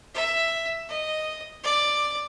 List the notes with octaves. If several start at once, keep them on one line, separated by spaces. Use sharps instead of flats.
E5
D#5
D5